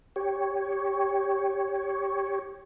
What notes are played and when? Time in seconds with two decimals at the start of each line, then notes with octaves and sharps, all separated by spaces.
0.16 G4 C#5